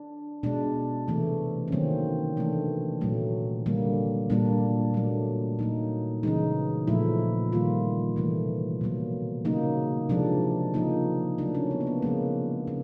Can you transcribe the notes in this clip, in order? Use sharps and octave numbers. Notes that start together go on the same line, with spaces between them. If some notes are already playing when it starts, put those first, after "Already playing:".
Already playing: D4
B2 G#3 D4
C3 E3 A3
C#4
D#3 F#3 A#3 C4
C3 E3 A3 D4
A#2 F#3 A3
D3 G3 A#3
A#2 G3 A#3 D4
A#2 F#3 A3 D4
A#2 F#3 A#3 D#4
C#3 E3 G#3 D#4
A#2 F3 A3 E4
D#3 G3 A#3 F4
C3 E3 A3
B2 F#3 A#3
C#3 F#3 A#3 D#4
C3 F3 G#3 D4
C#3 F3 A#3 D#4
C#3 F#3 A3 D4
C#4
B3
A#3
B3
C#3 F3 G#3 A#3
C#3